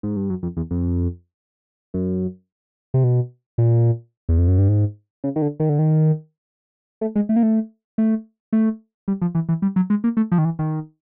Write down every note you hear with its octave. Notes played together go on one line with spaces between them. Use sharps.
G#2
G2
F#2
F2
E2
F2
F#2
C3
B2
A#2
E2
F2
F#2
G2
G#2
C#3
D#3
D3
D#3
D3
D#3
A3
G#3
A3
A#3
A3
A3
A3
G3
F3
E3
E3
G3
F#3
G#3
A#3
A3
F3
D#3
E3
D#3